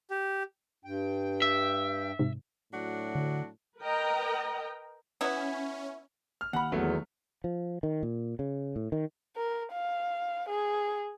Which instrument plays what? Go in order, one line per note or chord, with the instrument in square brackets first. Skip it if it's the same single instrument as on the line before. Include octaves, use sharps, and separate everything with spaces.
[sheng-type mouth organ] G4
[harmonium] G2 G5
[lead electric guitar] E5
[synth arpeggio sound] G#2 C3
[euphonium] A2 [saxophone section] F#3 D4 F#4
[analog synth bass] D3
[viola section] A#4 B4 D#5 G5 A#5
[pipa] B3 E4 [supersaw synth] C#4
[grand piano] F6
[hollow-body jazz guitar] D#2 B5 [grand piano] F#5
[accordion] E2 [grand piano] F#3 A3 B3
[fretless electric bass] F3
D#3
A#2
C#3
A2
D#3
[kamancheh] A#4
F5
G#4